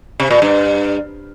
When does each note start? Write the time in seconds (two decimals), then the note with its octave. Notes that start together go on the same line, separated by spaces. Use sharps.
0.20 C3
0.31 A#2
0.42 G2